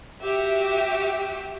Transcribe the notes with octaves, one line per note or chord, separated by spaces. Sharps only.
F#4 G4 E5